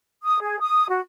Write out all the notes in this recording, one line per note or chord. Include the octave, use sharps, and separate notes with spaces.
D#6
G#4
D#6
F#4